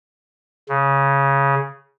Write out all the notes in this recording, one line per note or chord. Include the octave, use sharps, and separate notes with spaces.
C#3